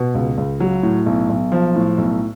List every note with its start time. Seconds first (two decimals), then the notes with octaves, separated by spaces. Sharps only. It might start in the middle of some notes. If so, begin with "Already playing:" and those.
Already playing: B2
0.15 C#2
0.37 C#2
0.60 F#3
0.83 A2
1.06 B1
1.29 B1
1.52 F3
1.76 A2
1.98 B1